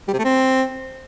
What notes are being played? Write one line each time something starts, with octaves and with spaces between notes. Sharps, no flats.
G3
C3
A3
C4